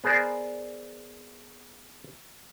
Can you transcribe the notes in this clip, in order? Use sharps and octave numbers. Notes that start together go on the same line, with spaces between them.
B3 G#4 A#4 C5 D5